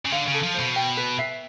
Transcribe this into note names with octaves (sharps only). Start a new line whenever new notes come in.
C#3
D3 F5
C#3
A4
F3
C5
B2
G5
B4
E5